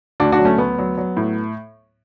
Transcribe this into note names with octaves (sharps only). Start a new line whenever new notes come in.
D2 D4 F#4
D4 F#4
F#3
A3 C#4
D2 B3
F#3
F#3
A2